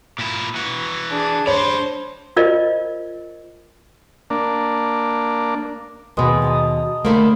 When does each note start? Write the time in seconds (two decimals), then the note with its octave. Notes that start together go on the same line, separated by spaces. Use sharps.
0.18 A#2 E4
0.56 E3 F#4
1.10 D4 G#4
1.47 D4 C5 C#5 B5
2.36 F4 A#4 C5 D5 D#5
4.30 A#3 D4
6.17 D#2 B2 G#3 B4 D#5
6.42 A5 A#5 D#6
7.05 D3 A3 A#3 C5 A#5 B5